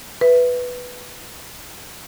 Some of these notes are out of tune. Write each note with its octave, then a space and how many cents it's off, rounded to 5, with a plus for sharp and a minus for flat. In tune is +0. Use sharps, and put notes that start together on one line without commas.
B4 +0 E5 +5